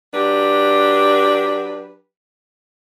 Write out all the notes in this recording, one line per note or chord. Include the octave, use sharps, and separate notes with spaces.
F#3 D4 G4 B4